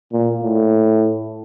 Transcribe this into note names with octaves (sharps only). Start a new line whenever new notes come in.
A#2
A2